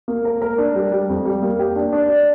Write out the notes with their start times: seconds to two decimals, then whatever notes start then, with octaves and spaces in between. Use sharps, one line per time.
0.08 A#3
0.25 A#4
0.42 A#4
0.58 D4
0.75 G3
0.92 G3
1.09 F2
1.25 G3
1.42 A#3
1.59 G4
1.76 D4
1.93 D4
2.10 D5